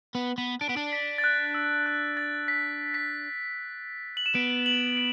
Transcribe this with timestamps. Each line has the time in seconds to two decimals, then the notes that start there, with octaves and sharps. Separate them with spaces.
0.15 B3
0.38 B3
0.61 D4 D7
0.69 B3
0.77 D4
0.93 B6
1.18 A6
1.24 F#6
1.54 E6
1.86 F#6
2.17 A6
2.48 B6
2.94 B6
4.17 F#7
4.26 E7
4.35 B3 D7
4.66 F#7
4.97 D7